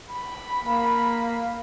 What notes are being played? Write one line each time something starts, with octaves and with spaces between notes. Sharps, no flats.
B5
A#3